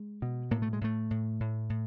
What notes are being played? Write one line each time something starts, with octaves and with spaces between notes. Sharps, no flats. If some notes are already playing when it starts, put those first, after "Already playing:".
Already playing: G#3
B2
A2 A#3
A3
G#3
A2 A3
A2
A2
A2